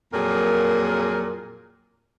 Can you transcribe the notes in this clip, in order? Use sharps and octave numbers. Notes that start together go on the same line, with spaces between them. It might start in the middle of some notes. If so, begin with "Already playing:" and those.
F2 A#2 F#3 A#3 G#4 A#4